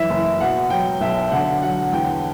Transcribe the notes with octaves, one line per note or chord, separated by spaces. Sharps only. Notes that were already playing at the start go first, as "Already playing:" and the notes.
Already playing: F#2 E3 E5
F#1
B2 F#5
F#3 G5
B1 E5
D3 F#5
F#3 F#5
E2 G5